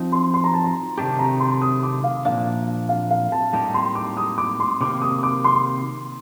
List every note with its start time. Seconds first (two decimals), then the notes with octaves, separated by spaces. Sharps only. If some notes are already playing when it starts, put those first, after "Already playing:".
Already playing: F3 C4 D#4
0.12 C6
0.34 C6
0.44 A#5
0.54 A5
0.64 A#5
0.98 C3 D#3 A3 D4 G4 A5
1.19 A#5
1.40 C6
1.62 D#6
1.83 D6
2.04 F5
2.25 A#2 F3 A#3 D4 F5
2.89 F5
3.11 F5
3.32 A5
3.53 A2 G3 A#3 D#4 G4 A5
3.74 C6
3.95 D6
4.17 D#6
4.38 D6
4.60 C6
4.81 C3 D#3 A#3 D6
5.02 D#6
5.23 D6
5.44 C6